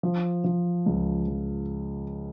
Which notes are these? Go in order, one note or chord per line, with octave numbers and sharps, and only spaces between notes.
F3
F3
C#2
F3